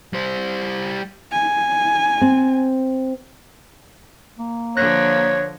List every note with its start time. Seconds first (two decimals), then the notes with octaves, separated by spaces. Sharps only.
0.13 G3 C5
1.32 G#5
2.21 C4
4.39 A#3
4.77 D3 F3 C#5 F#6 A#6